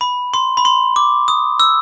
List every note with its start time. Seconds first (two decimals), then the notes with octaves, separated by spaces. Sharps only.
0.01 B5
0.34 C6
0.57 B5
0.65 C6
0.96 D6
1.28 D#6
1.60 E6